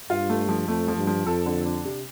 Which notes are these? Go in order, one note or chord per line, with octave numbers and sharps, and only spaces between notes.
G2 F4
A3
F3
F2 A3
F3
G2
F3
F2 A4
D3
D4
C3